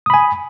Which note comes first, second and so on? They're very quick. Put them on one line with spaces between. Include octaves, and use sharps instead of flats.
D#6 B5 G#5